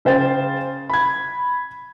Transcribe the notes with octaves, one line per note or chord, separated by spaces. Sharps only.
C#3 C5 G5 A6
B5 G#6